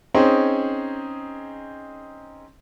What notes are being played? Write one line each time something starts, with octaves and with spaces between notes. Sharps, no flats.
C4 C#4 D#4 G#4 C5